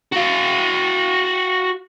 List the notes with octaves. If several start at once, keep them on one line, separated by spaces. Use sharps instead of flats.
F#4 F5